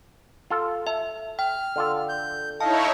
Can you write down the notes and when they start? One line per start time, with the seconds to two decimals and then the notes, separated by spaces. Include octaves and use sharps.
0.50 F4 A4
0.87 A4 E5
1.39 G5 F6
1.76 D3 F4 A4
2.09 G6
2.61 D#4 E4 C#5 D#5 F5 A5